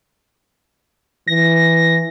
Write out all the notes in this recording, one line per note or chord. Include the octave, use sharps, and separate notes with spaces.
E3 A#6